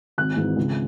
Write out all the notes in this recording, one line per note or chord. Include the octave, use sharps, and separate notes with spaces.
G#1 F#6
G#2 E3
C#2